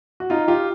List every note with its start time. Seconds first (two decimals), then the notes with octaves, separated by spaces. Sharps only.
0.20 F#4
0.30 D#4 F4
0.48 F4 G4